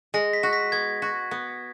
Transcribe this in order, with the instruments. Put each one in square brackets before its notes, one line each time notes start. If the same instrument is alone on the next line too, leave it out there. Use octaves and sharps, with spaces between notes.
[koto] G#3 [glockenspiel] A#6
[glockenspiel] B6
[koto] F#4
[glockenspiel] B6
[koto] B3 [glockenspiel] G#6
[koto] F#4
B3